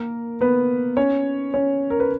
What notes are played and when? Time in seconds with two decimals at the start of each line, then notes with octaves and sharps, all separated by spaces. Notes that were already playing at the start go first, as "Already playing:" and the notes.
Already playing: A#3 A#4
0.41 B3 B4
0.97 C#4 C#5
1.54 C#4 C#5
1.90 A#4
2.00 B4